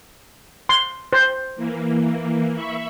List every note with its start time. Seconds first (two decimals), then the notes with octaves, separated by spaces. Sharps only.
0.69 C6
1.13 C5
1.56 E3 A#3
2.54 E5 B5 C#6